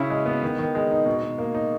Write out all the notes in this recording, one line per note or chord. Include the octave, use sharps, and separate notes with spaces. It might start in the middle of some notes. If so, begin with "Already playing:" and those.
Already playing: C#3 C#4 E4
G#3
B3
D#3
D#3
G#3
D#4
B2
B2
A#3
D#4